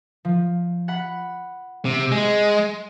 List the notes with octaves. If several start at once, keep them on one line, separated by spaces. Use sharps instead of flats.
F3
F#5 B5
C3
G#3